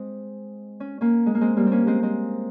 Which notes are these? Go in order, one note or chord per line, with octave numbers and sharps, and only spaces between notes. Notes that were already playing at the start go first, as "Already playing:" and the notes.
Already playing: G#3 C4
C#4
A#3 C#4
G#3
A#3
G#3 C4
G3 A#3
C4
A#3 C#4
G#3 C4
G#3 C4